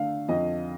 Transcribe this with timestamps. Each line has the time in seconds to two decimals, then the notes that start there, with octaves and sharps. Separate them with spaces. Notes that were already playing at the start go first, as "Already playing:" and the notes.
Already playing: D3 A3 F5
0.28 F2 D#5